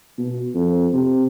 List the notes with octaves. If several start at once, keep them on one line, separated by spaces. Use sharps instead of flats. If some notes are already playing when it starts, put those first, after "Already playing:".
B2
F2
C3